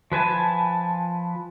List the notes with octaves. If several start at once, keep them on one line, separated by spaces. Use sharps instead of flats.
F3 B4 G#5 A5